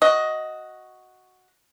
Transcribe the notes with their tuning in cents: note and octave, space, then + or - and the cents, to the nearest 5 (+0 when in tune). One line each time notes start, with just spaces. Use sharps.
F#4 +0 D#5 +10